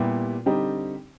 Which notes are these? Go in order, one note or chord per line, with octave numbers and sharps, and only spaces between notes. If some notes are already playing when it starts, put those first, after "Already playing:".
Already playing: A#2 G3 B3 E4 G4
D3 G3 C4 D#4 G4